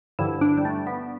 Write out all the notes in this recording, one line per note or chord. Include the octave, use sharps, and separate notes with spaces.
G2 D3 F3 E4
D4
G3
A3
B3